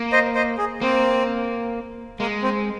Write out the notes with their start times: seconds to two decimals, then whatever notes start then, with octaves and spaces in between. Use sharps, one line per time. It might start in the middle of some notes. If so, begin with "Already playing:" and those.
Already playing: A#3
0.12 C5 D#5
0.35 C5 D#5
0.58 G#4
0.81 A#3 C4
2.20 G#3 A#3
2.43 C4